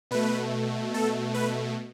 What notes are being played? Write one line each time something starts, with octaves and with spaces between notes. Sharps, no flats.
B2 A3 B4
A4
B4